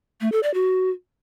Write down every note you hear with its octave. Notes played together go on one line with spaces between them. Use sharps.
A3
A4
D5
F#4